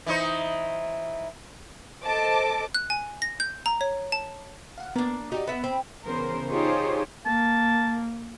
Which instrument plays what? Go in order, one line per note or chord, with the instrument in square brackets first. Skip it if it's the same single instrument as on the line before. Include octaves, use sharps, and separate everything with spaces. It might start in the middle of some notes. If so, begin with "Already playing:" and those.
[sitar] E3 D#4 C5
[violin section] A4 C5 D#5 A5 D6
[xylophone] F#6
G#5
A#6
G6
A#5
C#5
A5
[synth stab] F5 F#5
[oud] A#3 D4 [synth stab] B3
[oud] D#4 [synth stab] F#4 G4 D5
[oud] B3 E5 [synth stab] F#5
[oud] C4 [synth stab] B5
[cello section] C#3 E3 B3 A#4 C5
D#4 F4 G4 G#4 C5 C#5
[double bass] A#3 [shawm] A5